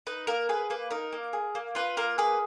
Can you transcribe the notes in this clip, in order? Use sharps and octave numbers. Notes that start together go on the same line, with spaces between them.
D#4 B4
A#3 A#4
G#4 B4
A#3 B4
D#4 A#4
A#3
G#4
A#3
F4 B4
A#3 A#4
G#4 B4